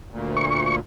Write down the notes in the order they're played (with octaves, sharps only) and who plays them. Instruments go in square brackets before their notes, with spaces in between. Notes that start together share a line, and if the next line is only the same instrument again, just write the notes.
[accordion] D2 A#2
[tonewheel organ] C#6